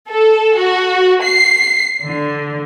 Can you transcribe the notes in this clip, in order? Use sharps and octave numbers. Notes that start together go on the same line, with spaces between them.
A4
F#4
C7
D3